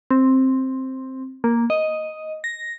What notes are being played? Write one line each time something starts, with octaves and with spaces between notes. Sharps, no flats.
C4
A#3
D#5
A#6